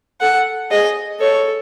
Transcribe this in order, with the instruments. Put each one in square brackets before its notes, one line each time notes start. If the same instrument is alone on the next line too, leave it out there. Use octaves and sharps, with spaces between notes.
[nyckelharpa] A4 [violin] F#5
[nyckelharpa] G#4 [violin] D#5
[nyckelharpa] A4 [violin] C#5